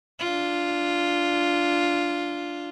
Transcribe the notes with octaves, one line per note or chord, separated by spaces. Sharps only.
D4 F4